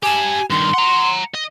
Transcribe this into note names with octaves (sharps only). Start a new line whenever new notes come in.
G4 G#5 A5
G2 D#3 C6
F#5 A#5
D#5